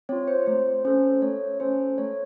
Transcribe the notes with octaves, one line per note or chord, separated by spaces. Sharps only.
C4 F4 C#5
C5
A3 C5
C#4 A4 C5
A3 C#5
C#4 A4 C5
A3 C#5